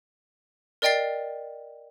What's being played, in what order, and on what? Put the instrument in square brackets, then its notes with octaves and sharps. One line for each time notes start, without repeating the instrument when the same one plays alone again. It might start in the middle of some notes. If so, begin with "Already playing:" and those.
[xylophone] A#4 D5 D#5 G5 A6 C7